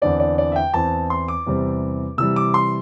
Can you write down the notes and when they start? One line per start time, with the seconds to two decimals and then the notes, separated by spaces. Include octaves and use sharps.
0.02 E2 D3 C4 D5
0.20 D5
0.38 D5
0.52 E5
0.56 G5
0.74 E2 E3 C4 A5
1.10 C6
1.28 D6
1.46 E2 C3 G3 C4
2.18 C3 E3 G3 E6
2.36 D6
2.54 C6